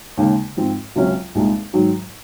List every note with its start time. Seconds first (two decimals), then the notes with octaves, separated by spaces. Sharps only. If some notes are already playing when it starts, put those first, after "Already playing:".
0.17 D#2 C#3 G#3 D#4
0.57 G#2 F3 C4
0.96 C#2 C3 F#3 C#4
1.35 C2 A#2 G#3 D#4
1.73 G#2 D#3 F#3